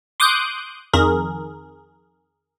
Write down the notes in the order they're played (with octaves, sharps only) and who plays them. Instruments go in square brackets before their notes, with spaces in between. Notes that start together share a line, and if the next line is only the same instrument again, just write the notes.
[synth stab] C6 D6 D#6 F#6 G6
F2 D#3 G#4 A#4